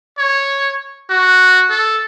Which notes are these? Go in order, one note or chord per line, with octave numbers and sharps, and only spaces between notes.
C#5
F#4
A4